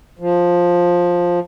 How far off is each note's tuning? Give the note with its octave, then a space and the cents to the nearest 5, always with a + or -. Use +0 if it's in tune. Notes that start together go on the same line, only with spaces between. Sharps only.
F3 +10